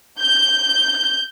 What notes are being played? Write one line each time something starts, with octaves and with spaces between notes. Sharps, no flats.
G6